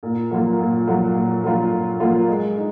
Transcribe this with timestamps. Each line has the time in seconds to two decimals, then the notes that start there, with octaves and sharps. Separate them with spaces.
0.03 A#2
0.31 F#3 A#3 F4
0.60 A#2
0.87 F#3 A#3 F4
1.15 A#2
1.44 F#3 A#3 F4
1.71 A#2
2.00 F#3 A#3 F4
2.28 G#3
2.56 D#4